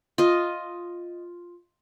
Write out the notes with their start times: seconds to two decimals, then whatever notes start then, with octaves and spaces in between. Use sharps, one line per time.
0.18 F4 D#5